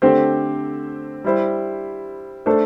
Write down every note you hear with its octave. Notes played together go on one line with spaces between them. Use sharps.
D3 A3 C4 G4 C5
G3 E4 C5
A3 D4 A4 C5